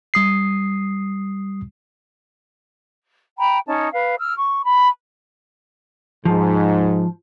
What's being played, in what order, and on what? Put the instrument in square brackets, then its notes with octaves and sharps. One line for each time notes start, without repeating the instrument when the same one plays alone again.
[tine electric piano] G3 D#6 C7
[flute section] G5 A#5 B5
C#4 D#4 A5
B4 F5
E6 F6
C#6
B5
[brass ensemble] G#2 [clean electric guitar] F3